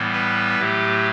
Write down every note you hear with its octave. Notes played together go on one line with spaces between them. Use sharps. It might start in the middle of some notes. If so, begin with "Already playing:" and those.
Already playing: A2 E3 G3 B3
B4
A2 F#3 A3 G4